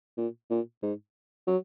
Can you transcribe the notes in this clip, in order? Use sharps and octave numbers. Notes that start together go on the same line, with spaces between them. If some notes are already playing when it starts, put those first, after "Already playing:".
A#2
A#2
G#2
F#3